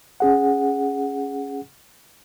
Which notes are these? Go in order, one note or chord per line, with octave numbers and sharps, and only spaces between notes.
C#4 G#4 F#5